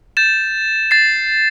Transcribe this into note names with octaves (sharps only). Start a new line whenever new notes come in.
G6 A6 E7
A6 C7